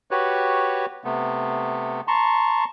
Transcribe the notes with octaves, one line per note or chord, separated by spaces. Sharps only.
F#4 G4 B4 C#5
C3 A3 B3
A5 A#5 C6 C#6